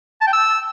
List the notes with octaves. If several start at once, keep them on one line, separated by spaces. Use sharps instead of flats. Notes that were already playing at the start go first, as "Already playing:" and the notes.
A5
G5
E6